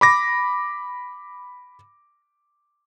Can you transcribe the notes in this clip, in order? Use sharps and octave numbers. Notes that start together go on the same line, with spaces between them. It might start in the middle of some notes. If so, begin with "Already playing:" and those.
B5 D6 A#6